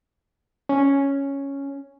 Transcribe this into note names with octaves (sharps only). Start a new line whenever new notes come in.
C#4